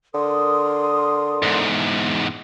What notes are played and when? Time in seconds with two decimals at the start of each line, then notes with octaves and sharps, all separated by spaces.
0.14 D3 A#4 C6 D#6
1.42 E2 G#2